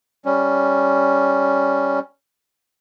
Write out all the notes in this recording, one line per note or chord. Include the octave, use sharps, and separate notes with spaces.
G3 C#4